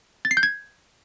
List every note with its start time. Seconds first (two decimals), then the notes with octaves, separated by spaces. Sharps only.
0.25 A6
0.31 C7
0.37 G6
0.43 G#6